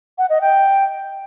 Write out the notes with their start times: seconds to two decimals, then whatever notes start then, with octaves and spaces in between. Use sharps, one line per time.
0.18 F#5
0.30 D#5
0.41 G5